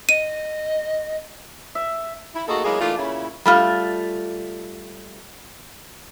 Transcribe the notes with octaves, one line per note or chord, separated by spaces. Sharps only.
D#5 D#7
E5
E4
A3 A#3 D#4 F#4 G#4 A4
F#3 G#3 A#3 B3 E4 G#4
E3 A3 A#3 D4 D#4 F4
A#2 C#3 C#4 E4
G3 A3 F4